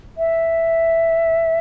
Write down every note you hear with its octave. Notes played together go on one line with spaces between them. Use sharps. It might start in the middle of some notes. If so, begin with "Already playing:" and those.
E5